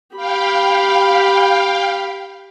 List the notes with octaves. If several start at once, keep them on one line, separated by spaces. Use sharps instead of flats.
G4 F5 G5 B5